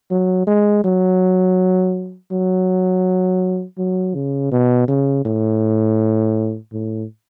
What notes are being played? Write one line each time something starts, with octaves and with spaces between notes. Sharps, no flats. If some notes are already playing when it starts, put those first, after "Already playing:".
F#3
G#3
F#3
F#3
F#3
C#3
B2
C#3
A2
A2